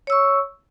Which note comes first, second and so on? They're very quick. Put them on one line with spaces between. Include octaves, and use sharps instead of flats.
C#5 E6 C#6